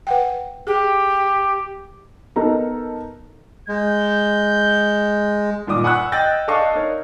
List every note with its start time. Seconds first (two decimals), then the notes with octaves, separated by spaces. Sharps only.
0.07 B4 F#5 G5
0.67 G4 G#4
2.36 B3 D#4 A4 A#4 A#5
3.69 G#3 G6
5.67 G2 A#2 D#3 D6 D#6
5.84 F#5 G#5 B5 C#6 E6 F#6
6.12 D#5 G5 E6 G6 A6 A#6
6.48 D4 A4 D#5 F5 C#6
6.75 D#4 A#4 C#5